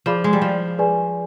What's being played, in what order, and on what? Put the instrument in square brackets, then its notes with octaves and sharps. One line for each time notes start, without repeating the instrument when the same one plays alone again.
[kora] F3 [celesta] G#4 D5 F5 B5 D6
[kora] G#3
G3
F3
[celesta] G#4 B4 D5 G#5